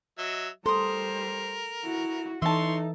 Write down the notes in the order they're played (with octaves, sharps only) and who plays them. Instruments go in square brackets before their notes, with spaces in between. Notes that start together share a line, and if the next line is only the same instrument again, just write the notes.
[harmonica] F#3 D#5 E5
[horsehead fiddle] G3 C5 [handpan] A4 [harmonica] A#4 [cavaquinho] C6 D#6
[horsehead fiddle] E4 F#4
[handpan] E3 [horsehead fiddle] D#4 A4 [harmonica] C#5 C6 [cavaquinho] E5 A5